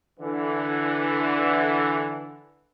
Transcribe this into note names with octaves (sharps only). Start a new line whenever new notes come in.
D3 E3